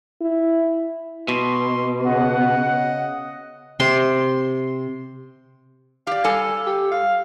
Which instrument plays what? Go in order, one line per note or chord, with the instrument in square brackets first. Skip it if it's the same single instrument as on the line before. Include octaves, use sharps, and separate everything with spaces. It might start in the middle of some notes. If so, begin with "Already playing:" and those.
[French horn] E4
[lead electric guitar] B2 [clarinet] C6
[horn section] C#3 F#5 [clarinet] D#5
[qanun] C3 C6
[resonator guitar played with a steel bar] G4 D5 [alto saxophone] F5
[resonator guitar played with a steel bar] G3 A4 G#5
[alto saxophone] G4
F5